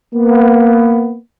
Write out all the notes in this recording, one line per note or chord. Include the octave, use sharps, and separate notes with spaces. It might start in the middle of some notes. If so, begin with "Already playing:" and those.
A#3 B3